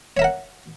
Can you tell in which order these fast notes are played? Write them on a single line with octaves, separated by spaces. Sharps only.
C#5 E5 A#4 F#5